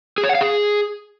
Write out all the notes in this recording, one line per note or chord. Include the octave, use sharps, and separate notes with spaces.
G#4
C#5
F#5
F5
G#4